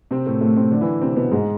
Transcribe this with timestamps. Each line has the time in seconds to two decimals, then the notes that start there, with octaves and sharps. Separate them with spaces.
0.11 C3 C4
0.26 A2 A3
0.41 A2 A3
0.56 C3 C4
0.71 D3 D4
0.81 E3 E4
1.01 C3 C4
1.16 B2 B3
1.31 G#2 G#3